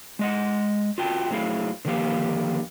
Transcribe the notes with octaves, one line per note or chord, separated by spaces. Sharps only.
G#3 D#5 F#5
F4 F#4 G5 A5
F#3 A3 E4 G#4 F5
D3 D#3 F3 A#3 G4 F5